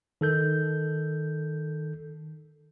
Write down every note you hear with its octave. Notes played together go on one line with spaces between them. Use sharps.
D#3 A4 G6